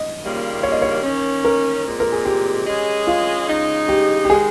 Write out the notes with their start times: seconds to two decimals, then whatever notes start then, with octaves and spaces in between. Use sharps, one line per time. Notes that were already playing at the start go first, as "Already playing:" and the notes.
Already playing: D#5
0.22 D#2 C#3 G3 A#3 F4
0.63 C#5
0.72 D#5
0.82 C#5
1.03 D#3 A#3 C#4
1.45 A#4
1.85 A#2 G#3 C4
2.00 A#4
2.12 G#4
2.25 G4
2.66 G#3 C#4 G#4 D#5
3.07 F4
3.48 C#3 G#3 D#4
3.89 G4
4.25 G4
4.30 D#3 G#3 G#4